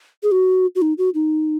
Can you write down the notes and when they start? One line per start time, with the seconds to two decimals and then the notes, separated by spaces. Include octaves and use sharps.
0.23 G#4
0.32 F#4
0.76 F#4
0.82 D#4
0.98 F#4
1.14 D#4